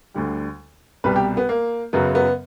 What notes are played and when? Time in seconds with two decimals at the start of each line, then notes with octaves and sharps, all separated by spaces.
0.14 D2 D3 G3
1.04 C2 B2 G3 B4
1.16 G4
1.37 B3
1.49 A#3
1.93 F#2 C#3 F#3 B3
2.15 B3